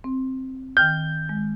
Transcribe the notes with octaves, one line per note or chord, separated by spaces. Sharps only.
C4
D#3 G5 F6 G6
G#3